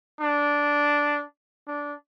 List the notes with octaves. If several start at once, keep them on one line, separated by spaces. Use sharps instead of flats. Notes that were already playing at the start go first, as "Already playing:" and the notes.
D4
D4